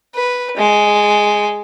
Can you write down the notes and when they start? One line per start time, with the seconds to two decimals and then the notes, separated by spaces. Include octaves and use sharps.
0.15 B4
0.57 G#3